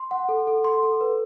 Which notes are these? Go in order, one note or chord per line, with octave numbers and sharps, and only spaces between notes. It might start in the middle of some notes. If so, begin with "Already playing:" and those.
Already playing: C6
F#5
A4
A4
C6
A4
B4